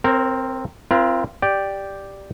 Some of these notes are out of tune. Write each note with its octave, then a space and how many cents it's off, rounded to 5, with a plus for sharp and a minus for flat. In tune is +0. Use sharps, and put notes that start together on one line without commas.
C4 +0 A#4 -10 C#5 -45
C4 +0 F4 -35 A#4 +35
G4 +0 D5 +0 G5 +0